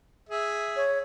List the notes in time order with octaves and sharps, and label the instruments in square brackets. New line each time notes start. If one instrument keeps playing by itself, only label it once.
[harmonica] G#4 E5
[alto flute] C#5